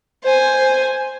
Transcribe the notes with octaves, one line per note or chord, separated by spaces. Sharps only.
C5 G#5